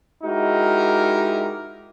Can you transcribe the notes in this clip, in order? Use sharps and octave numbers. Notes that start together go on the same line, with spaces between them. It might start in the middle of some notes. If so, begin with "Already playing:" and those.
G#3 D#4 E4 F#4 G4 A#4